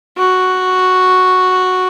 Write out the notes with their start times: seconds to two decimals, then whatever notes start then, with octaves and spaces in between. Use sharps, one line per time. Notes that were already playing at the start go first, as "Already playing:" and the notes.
0.18 F#4